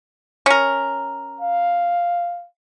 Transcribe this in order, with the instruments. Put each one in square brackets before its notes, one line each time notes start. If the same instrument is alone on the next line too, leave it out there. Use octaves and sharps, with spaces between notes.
[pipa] C#4 A#4
[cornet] F5